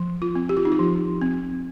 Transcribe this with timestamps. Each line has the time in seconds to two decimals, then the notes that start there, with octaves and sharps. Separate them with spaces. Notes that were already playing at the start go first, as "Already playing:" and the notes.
Already playing: F3
0.22 F4
0.35 C4
0.49 G4
0.57 F4
0.65 D#4
0.72 F4
0.79 F3
1.22 C4